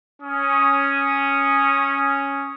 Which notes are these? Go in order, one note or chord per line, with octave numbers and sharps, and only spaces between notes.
C#4 D#6